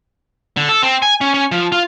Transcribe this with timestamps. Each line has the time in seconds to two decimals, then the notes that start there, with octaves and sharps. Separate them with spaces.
0.57 D3
0.69 A4
0.83 C4
1.02 G#5
1.21 C#4
1.34 C#4
1.52 F3
1.72 F4